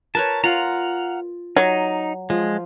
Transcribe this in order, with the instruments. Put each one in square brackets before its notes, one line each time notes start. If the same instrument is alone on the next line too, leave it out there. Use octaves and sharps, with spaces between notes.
[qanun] A#4 B4 C#5 [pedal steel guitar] A5
[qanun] F4 [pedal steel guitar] F5 F#5 A#5
[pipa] F#3 [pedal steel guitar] D#4
[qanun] F3 [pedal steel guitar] G#3